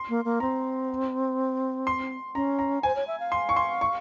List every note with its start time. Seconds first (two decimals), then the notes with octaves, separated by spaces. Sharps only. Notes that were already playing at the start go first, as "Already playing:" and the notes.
Already playing: C6
0.09 A#3
0.25 A#3
0.40 C4 A#5
1.87 C6
2.35 C#4 A#5
2.59 A#5
2.83 C5 G#5
2.96 C#5
3.07 E5
3.20 F5
3.32 C6
3.49 C#6
3.56 C6
3.81 C#6